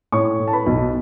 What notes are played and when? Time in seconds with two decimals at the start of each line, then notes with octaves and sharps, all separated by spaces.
0.12 A2 C#5 C#6
0.39 A2
0.47 A5
0.53 B4 B5
0.66 B1